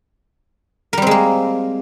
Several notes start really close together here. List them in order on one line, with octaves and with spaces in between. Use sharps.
A#4 G3 C4 G#3 A#3